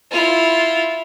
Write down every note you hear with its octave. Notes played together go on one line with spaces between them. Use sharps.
E4 F4